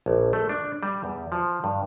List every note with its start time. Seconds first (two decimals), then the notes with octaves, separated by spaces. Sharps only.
0.06 A#1
0.33 A3
0.49 D4
0.83 G3
1.04 E2
1.32 F3
1.64 G2